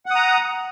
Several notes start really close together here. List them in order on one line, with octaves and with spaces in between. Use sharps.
F#5 D#6 A#5